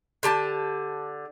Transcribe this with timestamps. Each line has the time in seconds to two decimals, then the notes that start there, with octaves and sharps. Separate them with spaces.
0.23 D3 G4 A5